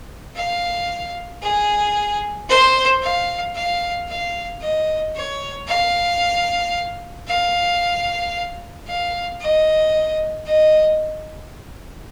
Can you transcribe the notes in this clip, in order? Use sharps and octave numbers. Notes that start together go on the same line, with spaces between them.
F5
G#4
C5
F5
F5
F5
D#5
C#5
F5
F5
F5
D#5
D#5